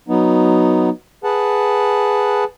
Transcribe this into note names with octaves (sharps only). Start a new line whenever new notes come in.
F#3 B3 D#4
G#4 B4 F#5 A5